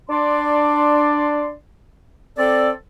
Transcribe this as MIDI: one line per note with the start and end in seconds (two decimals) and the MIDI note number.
0.10 1.51 62
0.10 1.51 74
0.10 1.51 84
2.38 2.70 60
2.38 2.70 69
2.38 2.70 74